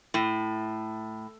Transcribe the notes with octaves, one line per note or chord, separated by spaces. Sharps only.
A2